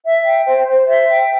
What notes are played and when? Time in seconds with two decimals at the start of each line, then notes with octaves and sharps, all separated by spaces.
0.03 E5
0.24 G5
0.45 C5
0.66 C5
0.86 E5
1.07 G5